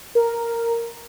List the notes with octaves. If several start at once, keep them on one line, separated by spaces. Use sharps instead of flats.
A#4